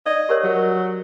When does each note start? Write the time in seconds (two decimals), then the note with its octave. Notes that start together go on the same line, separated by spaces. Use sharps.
0.06 D5 D#5
0.29 G4 A#4 C#5
0.44 F#3